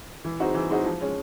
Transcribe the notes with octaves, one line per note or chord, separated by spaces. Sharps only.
E3
G#3 C4 D#4 F#4
E3
G#3 C4 D#4 F#4
F3
G#3 C#4